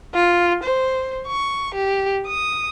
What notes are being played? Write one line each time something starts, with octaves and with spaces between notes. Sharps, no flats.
F4
C5
C#6
G4
D#6